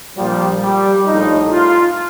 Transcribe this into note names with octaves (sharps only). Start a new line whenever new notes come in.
A#1 A#2 F3 G3
G3
A#1 A2 F3 D#4
F4